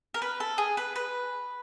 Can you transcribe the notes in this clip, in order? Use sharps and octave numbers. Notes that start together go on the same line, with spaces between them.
A#4
B4
A4
G#4
B4
B4